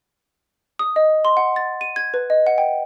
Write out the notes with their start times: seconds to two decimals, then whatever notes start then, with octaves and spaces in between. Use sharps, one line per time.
0.79 D#6
0.96 D#5
1.25 C6
1.37 F#5
1.56 A6
1.81 D#7
1.96 G#6
2.14 B4
2.30 D#5
2.47 F#5
2.58 G5